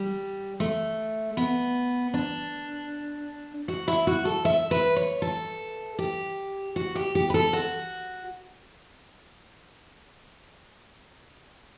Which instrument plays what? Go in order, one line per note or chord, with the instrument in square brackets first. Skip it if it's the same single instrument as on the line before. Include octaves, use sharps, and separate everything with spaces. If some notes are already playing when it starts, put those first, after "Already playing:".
Already playing: [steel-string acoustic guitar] G3
A3
B3
D4
F#4
E4
F#4
A4
E5
B4
C#5
A4
G4
F#4
G4
G4
B4
A4
F#4